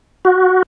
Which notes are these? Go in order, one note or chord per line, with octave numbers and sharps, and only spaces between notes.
F#4